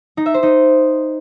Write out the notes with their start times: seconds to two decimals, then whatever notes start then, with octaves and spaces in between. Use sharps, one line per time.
0.17 D#4
0.26 E5
0.34 C5
0.43 D#4